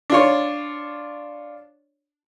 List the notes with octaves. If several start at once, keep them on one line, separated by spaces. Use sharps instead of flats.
D4 F4 C#5